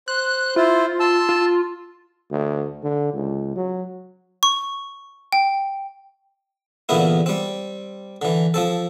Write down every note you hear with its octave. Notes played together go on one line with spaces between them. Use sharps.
C5 F#6
E4 F4 C5
A5 C6 E6
F4
D2
D3
C#2
F#3
C#6
G5
E2 A#2 D3 B3 E4
G3 C4
D3 E3
F3 C4 A4